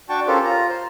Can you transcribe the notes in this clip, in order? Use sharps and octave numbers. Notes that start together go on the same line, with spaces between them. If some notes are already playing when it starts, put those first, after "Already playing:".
D4 F#4 G5 A5 C#6
C#4 F4 G4 A4 A#4 C5
F4 A#5
C5